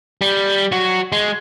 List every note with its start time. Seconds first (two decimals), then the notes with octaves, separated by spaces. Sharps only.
0.21 G3
0.72 F#3 F#4
1.12 G#3